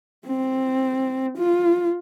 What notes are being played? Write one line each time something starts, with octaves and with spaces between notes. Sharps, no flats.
C4
F4